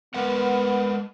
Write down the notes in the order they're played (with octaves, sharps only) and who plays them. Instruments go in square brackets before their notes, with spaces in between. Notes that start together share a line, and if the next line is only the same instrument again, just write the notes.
[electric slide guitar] G#3 A#4 F#5 [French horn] B3